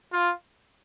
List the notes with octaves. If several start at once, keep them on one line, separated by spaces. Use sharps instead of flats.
F4